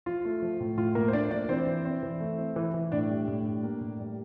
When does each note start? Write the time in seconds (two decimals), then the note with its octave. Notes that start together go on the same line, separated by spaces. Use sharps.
0.06 F3 F4
0.25 A3
0.42 F3
0.60 A2
0.77 A2 F4
0.95 A2 A#3 A#4
1.08 C5
1.13 A3 D4 D5
1.31 F3 D4 D5
1.49 E3 C4 C5
1.67 E3
1.85 C4
2.03 E3
2.20 A3
2.38 C4
2.56 E3
2.74 E3
2.92 A2 D4 D5
3.09 G3
3.27 A2
3.46 G3
3.63 A#3
3.81 A2
3.99 G3